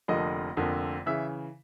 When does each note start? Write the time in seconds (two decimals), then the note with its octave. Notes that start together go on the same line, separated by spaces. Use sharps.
0.08 F1 F2 D3 F3 A#3 D#5
0.57 F1 F2 D3 F3 A#3
1.06 C#3 E3 E5